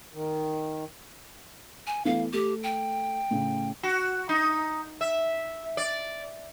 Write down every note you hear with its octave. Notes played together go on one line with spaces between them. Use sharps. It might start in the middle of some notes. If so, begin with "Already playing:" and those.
D#3
G#5
E3 A3 B3 F5
A3 G4
G5
A2 C#3
F#4
D#4
E5
D5